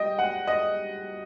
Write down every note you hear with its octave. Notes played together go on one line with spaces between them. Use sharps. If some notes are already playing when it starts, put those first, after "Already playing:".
Already playing: G3 D#5 G5
F#5
D#5